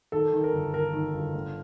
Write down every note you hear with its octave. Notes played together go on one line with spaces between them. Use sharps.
D#3 A4
D#3
A#4
G1
D#3 A#4
D#3
G1
D3